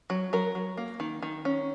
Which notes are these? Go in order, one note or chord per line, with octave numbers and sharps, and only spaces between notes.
F#3
F#3 A#4
F#3
A#3
D#3
D#3
C#4